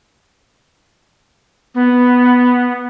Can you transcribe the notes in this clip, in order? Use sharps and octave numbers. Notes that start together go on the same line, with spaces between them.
B3